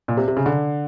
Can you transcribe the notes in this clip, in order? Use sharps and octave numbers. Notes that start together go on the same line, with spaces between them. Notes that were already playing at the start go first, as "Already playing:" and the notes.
A#2
C3
C3
C#3
D3